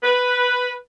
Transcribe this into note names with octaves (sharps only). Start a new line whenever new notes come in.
B4